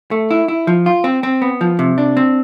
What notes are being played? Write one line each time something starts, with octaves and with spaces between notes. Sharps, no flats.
A3
E4
E4
F3
F4
C4
C4
B3
F3
C3
D4
C4